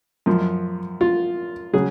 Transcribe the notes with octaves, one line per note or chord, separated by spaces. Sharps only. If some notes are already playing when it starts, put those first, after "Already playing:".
F#2 F3
F4
C#3 F#3 G#4